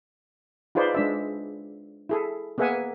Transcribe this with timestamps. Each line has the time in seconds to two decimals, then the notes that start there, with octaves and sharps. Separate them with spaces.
0.75 D#4 F4 G#4 B4 C5 D5
0.94 G#3 D4 E5
2.09 E4 G#4 A4
2.58 A#3 B3 G#4 E5 F#5 G#5